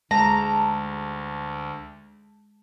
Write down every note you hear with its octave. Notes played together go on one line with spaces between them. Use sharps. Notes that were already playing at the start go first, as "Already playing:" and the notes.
D2 G#3 A5 A#5